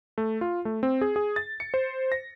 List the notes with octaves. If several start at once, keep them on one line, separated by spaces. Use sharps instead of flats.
A3
F4
A3
C4
G#4
G#4
A6
C#7
C5
A#6